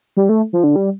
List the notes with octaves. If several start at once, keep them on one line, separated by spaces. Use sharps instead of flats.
G3
A3
F3
D3
G3